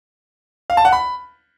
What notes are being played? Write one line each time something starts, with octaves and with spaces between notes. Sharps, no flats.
F5
A5
F#5
B5